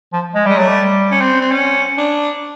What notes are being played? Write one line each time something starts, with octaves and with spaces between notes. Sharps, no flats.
F3
G#3
G3 G#3
F#3 A3
G3
C#4
C4
C4
C#4
D4